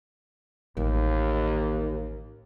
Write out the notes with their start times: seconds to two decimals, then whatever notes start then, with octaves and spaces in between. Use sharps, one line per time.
0.77 A1 D#2